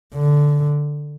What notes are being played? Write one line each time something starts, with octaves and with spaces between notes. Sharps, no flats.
D3